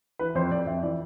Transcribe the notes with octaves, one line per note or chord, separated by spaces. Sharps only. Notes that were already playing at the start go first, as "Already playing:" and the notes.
E3 B4
F2 C5
F2 D5
F2 E5
E3 D5